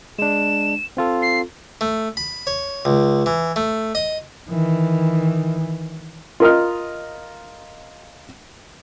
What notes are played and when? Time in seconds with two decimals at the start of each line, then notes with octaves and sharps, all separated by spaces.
0.19 G#3 D4 E7
0.97 C4 F4 A4
1.22 C7
1.81 A3
2.17 B5
2.47 C#5
2.85 C#2
3.26 E3
3.56 A3
3.95 D#5
4.50 D#3 E3
6.40 F4 A#4 D#5 F6